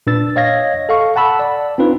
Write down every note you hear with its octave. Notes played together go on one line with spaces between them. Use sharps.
A#2 D4 B4 E6 A6
C#5 D#5 F5 G#6 A#6
A4 F5 C#6
F#5 A5 B5 E6
D5
C4 D4 D#4 F4 B4